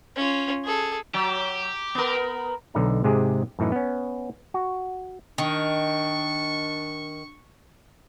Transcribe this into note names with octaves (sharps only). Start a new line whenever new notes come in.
C#4 F4
G#4 A4
F#3 G4
B3 A#4
B1 D3 D#4 A#5
G#2 C3 G#3 G4 G#4
F#2 A2 E3 D#4
B3 C#4
F#4
D#3 D4 C#6